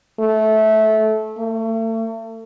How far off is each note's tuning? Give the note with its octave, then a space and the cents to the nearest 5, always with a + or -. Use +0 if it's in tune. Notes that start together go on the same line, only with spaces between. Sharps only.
A3 -20
A3 +35